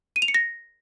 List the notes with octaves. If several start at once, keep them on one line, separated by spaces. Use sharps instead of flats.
D#7
F7
C#7
A#6